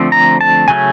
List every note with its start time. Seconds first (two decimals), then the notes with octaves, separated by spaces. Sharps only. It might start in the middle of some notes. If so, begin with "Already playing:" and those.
Already playing: D3 F3 A3 C4
0.12 A#5
0.41 A5
0.68 C#3 F#3 A3 C#4 G#5